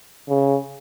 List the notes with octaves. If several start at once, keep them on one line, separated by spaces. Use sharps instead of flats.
C#3